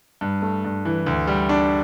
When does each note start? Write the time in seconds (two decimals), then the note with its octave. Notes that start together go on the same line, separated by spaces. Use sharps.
0.21 G2
0.42 A3
0.64 G2
0.85 E3
1.06 D2
1.27 G3
1.49 D4